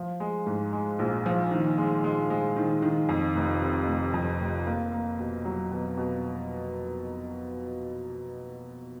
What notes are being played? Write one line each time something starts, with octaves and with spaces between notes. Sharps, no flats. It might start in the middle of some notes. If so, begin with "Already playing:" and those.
Already playing: F3
G#3
G#2
G#3
A#1
F3
D#3
G#3
G#3
G#3
D#3
D#3
F2
F1
C3
F1
F2
F1
A#3
A#3
B2
F#3
B2
B2